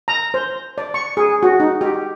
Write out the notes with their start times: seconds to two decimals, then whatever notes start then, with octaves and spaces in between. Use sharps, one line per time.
0.08 A#5
0.34 C5
0.78 D5
0.94 C#6
1.17 G#4
1.43 F#4
1.60 D#4
1.81 G4